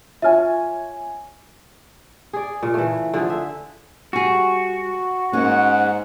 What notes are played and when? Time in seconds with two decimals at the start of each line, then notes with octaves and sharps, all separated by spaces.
0.22 F4 C#5 E5 G#5 F6
2.33 G#4 D5
2.63 A#2 C#3
2.74 E3 A3
3.14 D3 F3 G#4
3.30 E5
4.13 G3 F#4 G#4
5.33 G#2 A#3 C#4 F#5